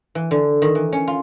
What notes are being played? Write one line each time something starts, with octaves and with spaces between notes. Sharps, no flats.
E3
D3
D#3
E3
C#4
F4